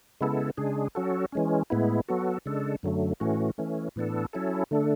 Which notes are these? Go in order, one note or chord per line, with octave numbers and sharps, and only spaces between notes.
C#3 G#3 B3 E4 A4
C#3 G#3 D4 G#4
F#3 C#4 F#4 A4
E3 G#3 C#4
A2 G#3 B3 E4
F#3 B3 F#4 A4
C#3 G#3 D4 A4
F#2 D3 F#3 A3
A2 E3 A3 C#4 F#4
E3 A3 C#4
A2 E3 B3 D4 A4
F#3 C#4 E4 A4
D3 A3 D4 A4